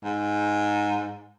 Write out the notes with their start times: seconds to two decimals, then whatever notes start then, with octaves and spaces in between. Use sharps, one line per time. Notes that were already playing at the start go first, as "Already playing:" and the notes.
0.04 G#2